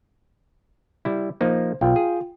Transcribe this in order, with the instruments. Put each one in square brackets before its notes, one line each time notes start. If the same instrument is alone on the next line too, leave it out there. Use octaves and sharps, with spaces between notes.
[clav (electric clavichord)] G3 E4
[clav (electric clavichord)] F3 A#3 D#4 [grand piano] C5
[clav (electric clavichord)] B1 [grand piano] F4 G5
[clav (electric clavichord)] G#4